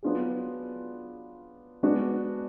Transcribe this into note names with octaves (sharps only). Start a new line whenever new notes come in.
F#3 B3 D4 F4 G#4
G#3 B3 D4 F#4